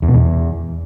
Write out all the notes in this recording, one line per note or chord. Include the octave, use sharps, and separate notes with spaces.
E2
B2
E2